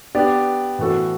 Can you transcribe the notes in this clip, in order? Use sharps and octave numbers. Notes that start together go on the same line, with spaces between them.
B3 D4 G4 D5
A2 E3 B3 F#4 A4